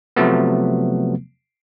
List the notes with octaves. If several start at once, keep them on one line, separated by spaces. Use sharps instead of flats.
C3 F3 F#3 A3 B3